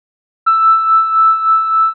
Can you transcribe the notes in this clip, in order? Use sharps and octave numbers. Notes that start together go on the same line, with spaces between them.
E6